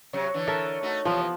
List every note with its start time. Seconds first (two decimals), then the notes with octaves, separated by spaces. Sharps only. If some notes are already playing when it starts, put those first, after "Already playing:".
0.13 C3 F#3 C#5
0.34 D3 E3
0.47 A4 A#4 E5
0.83 A3 D#4 F#4
1.05 C3 E3 F3 B3